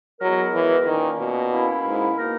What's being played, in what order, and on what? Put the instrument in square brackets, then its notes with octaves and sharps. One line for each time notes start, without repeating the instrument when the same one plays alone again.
[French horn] F#3 [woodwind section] G#3 B3 E4 A#4
[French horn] E3
[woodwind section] A#2 A#3 C#4 [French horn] D#3
[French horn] B2
[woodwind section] A#3 C#4 E4
[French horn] G#2
[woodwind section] B2 A#3 D#4 A#4